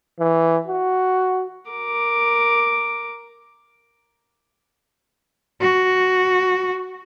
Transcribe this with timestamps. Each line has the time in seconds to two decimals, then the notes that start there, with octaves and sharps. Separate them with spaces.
0.19 E3
0.67 F#4
1.70 A#4 D6
5.61 F#4